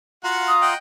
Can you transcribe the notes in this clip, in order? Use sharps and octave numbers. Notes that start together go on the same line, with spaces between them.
F4 F#4 F5 F#5 A#5
D#6
D#5 F#5 G5